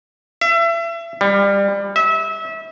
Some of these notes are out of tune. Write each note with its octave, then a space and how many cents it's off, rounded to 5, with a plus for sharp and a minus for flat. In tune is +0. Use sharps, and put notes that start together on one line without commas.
E5 +30
G3 +25
E5 -30